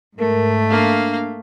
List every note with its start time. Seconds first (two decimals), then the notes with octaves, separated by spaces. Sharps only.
0.20 G#2 A3 A#4
0.71 A#3 D4 F5